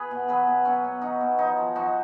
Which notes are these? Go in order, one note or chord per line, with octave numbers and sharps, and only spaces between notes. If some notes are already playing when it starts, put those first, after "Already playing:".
Already playing: G#4 B4
B2
F#3 G#4 B4
B2
F#3 C#4
B2
F#3 D#4
B2
F3 D#4
F3
F3 D#4 F#4